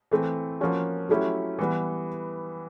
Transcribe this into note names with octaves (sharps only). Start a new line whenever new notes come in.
E3 A3 C4
F3 A#3 C#4 F#4
F#3 A3 C#4 E4 G4
E3 G3 B3